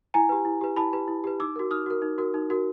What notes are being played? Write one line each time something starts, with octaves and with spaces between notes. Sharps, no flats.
E4 G#5 A#5
G4 B4
E4
G4 B4
E4 A5 B5
G4 B4
E4
G4 B4
D#4 D6 E6
F#4 A#4
D#4 D#6 F6
F#4 A#4
D#4
F#4 A#4
D#4
F#4 A#4